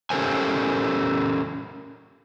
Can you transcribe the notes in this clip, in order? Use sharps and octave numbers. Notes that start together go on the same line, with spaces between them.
C#4 G4 A4 A#4 C5 G#5